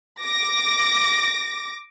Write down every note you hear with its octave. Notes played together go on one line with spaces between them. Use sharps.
D6 A#6